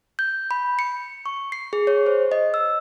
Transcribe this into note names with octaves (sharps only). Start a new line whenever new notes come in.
G6
B5
C#7
C#6
C7
G#4
C#5
C5
D#5
E6